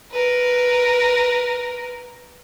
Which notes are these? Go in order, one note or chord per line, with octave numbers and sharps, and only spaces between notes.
A#4 B4